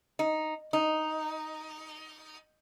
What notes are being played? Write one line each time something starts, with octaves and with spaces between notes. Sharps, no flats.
D#4
D#4